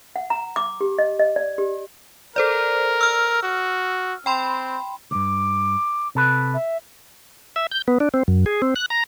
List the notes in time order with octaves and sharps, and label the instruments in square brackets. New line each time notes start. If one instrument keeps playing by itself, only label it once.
[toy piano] F#5
A#5
D6
G4
D#5
D#5
D5
G4
[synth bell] A4 C5 D5 [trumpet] A#4
[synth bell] E6 F6
[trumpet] F#4
[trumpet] C4 [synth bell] G5 B5 C6
[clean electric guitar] D2 G2 [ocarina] D6
[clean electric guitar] C3 A4 B4
[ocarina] E5
[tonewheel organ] E5
G6
B3
D4
C4
F#2
G#4
C4
F#6
A#5